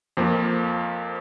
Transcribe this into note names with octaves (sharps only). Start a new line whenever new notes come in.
F2 F3 A#3